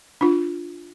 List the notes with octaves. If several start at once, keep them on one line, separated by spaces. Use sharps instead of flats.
D4 F4